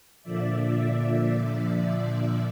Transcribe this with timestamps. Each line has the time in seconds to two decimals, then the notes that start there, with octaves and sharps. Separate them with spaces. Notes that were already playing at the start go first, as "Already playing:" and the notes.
0.23 A#2 D3 F3 D5 E5